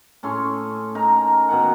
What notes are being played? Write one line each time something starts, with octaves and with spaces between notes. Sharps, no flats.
A2 C#4 A4 C6
D#4 A#4 A#5
B2 D#3 F#5